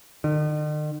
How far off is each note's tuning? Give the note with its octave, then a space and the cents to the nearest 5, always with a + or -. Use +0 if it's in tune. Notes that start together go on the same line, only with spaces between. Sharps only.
D#3 -45